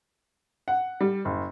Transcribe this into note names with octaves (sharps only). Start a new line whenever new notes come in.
F#5
G3
F#1